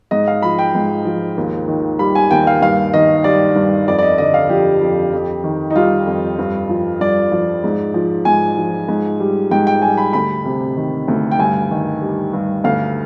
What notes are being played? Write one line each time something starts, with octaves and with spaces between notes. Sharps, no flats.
G#2 D#5
F5
F3 B5
G5
G#2
F3
D#2
D#3
G3 B5
G#5
D#2 G5
F5
G2 F5
D#3 D#5
G3 D5
G2
F2 D5
D5
D#5
D3 D#5
F5
F3 G4
F2
F2
D#3
D#4
G3 F4
F2
G2
F3
G2 D5
F3
G#2
F3
G#2 G#5
F3
G#2
G3
G#2 G5
G5
G3 G#5
B5
D2 B5
C3
D#3
D2
G5
G2 G#5
D#3
G3
G2
D2 F5